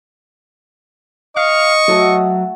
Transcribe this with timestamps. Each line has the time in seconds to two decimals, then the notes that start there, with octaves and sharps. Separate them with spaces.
1.36 D#5 F5 C#6
1.88 F#3 A3 F#4 A4